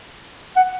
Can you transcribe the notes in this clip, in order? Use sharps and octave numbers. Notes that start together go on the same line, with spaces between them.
F#5